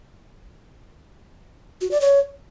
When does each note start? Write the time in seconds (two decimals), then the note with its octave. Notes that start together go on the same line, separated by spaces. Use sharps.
1.81 F#4
1.91 D5
2.01 C#5